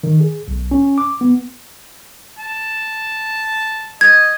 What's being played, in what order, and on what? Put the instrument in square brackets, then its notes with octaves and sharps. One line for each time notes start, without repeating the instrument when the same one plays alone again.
[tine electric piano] D#3
G#4
B1
C#4
D6
B3
[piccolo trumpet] A5
[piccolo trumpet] D#5 [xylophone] G#6